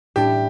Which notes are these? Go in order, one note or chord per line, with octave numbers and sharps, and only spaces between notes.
A2 G3 D4 G4